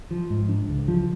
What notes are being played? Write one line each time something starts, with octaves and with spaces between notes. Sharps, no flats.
F3
G#2
D4
C#2
F3